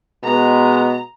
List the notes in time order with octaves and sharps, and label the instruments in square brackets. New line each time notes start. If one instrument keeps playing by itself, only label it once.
[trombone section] B2 G#3 B3 [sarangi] A#5